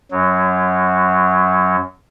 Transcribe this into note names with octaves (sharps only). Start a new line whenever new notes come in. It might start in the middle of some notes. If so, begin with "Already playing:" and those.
F#2 F#3